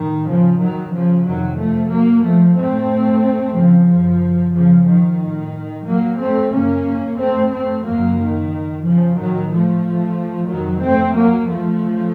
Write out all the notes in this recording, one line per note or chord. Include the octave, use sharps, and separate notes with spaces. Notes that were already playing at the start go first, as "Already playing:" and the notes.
Already playing: A2 D#3
C#3 F3
D#3 F#3
C#3 F3
F2 C3 D#3 F#3
F3 A3
F#3 A#3
F3 A3
A2 A3 C4
C#3 F3
F#2 C#3
C#3 F3
D#3
A2
F#3 A#3
A3 C4
F#2 C#3 A#3 C#4
A3 C4
A3 C4
F#2 C#3 F#3 A#3
D#3
C#3 F3
A2 D#3 F#3
F3 A3
F2 C3 D#3 F#3
A3 C4
F#3 A#3
F3 A3
C#3